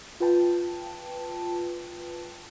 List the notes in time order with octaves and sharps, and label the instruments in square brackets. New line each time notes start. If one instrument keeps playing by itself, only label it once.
[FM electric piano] F4 B4 G5 A5